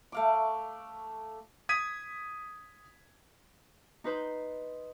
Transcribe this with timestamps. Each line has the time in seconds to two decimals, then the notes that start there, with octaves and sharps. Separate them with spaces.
0.12 A3 F5 D6
1.69 D#6 G#6 B6 D#7
4.04 D#4 B4 C5